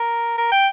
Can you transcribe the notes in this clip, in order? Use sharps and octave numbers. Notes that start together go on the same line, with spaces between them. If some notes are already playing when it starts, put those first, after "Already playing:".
Already playing: A#4
A#4
G5